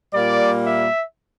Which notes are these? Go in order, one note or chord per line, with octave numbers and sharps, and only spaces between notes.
A#2 G3 A#3 D5
E5